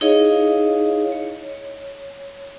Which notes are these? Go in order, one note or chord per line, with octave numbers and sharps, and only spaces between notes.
D#4 E4 G#4 C#5 D#5 F5
C#5